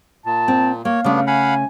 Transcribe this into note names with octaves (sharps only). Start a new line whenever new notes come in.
A#2 A5
C4
A#3 C#5 F5
G2 C#3 A3 B3 D4
F5 F#5 G#5 B5